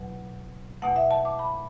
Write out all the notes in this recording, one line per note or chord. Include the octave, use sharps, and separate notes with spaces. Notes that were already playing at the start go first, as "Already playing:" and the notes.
Already playing: E2 B2 F#3
E2 B2 A3 F#5
E5
A5
D6
B5